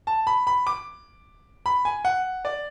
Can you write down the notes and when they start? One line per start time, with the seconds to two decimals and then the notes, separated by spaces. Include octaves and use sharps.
0.07 A5
0.27 B5
0.47 B5
0.67 D6
1.66 B5
1.85 G#5
2.05 F#5
2.45 D5